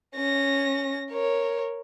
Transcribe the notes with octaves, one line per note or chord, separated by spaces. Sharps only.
C#4 A#6
A#4 C#5